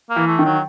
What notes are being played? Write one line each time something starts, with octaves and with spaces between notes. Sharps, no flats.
A#3
E3
A3
D#3
F#3